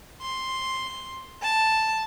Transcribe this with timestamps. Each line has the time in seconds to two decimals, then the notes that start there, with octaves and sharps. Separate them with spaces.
0.22 C6
1.42 A5